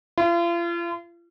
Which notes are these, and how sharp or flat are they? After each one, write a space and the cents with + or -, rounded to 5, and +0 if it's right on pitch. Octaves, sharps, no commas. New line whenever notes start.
F4 -40